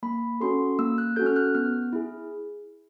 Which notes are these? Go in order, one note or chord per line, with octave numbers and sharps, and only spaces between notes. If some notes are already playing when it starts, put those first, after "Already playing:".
A#3 B5
C#4 F#4 A4 C6
A#3 E6
F#6
C#4 F#4 A4 G6
F6
F#6
B3 F6
E4 G#4